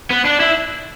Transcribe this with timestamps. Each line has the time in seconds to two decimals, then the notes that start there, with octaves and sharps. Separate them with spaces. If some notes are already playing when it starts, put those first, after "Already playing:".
0.10 B3
0.25 D4
0.40 E4